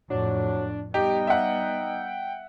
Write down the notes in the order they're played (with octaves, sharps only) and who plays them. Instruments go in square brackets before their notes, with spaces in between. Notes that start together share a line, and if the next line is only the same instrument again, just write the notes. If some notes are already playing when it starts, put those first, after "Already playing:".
[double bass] F2 A2 [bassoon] F#3 [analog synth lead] D4
[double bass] G3 B3 [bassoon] D#4 [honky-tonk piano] G4 [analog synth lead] G5
[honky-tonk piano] E5 F#5